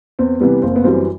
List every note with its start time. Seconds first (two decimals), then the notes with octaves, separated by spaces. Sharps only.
0.19 E2 C4
0.40 C3 E3 G3 B3
0.62 F#1 C4
0.76 B3
0.84 F#2 E3 G3 C4